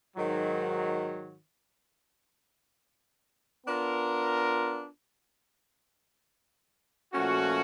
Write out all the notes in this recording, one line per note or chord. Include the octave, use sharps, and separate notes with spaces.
G#2 D#3 F#3
B3 D4 F4 A#4
A#2 F3 A3 C#4 F#4